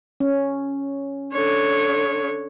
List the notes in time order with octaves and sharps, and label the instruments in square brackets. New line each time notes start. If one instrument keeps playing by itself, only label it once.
[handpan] C#4
[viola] D3 C#5